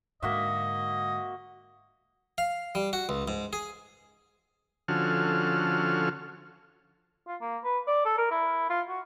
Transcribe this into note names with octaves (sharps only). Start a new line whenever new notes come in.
G#2 D3 A#3 F#4 D#5 E5
F5
G3
F#4
C#2
G#2
G#4
D3 F3 C#4 F#4 A4 F6
F4
A#3
B4
D5
A4
A#4
E4
F4
F#4